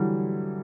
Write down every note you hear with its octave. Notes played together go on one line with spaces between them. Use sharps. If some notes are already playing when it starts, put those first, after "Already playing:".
Already playing: D3 E3 F#3 G3